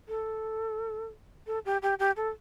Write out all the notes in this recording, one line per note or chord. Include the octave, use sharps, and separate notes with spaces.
A4
A4
G4
G4
G4
A4